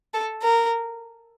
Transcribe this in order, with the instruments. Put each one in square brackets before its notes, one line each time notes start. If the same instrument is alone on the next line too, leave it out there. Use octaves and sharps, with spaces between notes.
[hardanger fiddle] A4
A#4